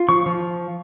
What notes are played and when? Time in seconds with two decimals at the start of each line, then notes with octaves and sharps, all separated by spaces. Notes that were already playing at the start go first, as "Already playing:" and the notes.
Already playing: F4
0.09 F3 C#6
0.26 F3